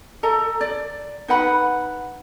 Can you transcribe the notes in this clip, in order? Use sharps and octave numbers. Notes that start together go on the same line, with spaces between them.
A4 D#5 A#5
D5
D#4 B4 F#5 B5